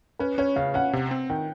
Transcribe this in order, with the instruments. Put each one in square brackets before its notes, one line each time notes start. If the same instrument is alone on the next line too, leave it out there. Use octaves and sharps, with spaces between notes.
[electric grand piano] C#4 [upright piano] B4
[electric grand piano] C#4 [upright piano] C#5
[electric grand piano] C#3 [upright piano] F5
[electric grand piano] C#4 [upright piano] F#5
[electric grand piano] C3
C4
[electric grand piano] D#3 [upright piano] G5